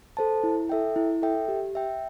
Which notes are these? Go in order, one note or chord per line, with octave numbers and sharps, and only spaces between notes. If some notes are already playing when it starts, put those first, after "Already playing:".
A4 C5 A5
E4
A4 E5 G5
E4
A4 E5 G5
G4
E5 G5